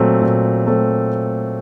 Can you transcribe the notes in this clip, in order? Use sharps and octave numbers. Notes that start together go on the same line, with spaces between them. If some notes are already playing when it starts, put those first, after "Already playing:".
Already playing: A#2 F#3 A3 C4
A#2
F#3 A3 C4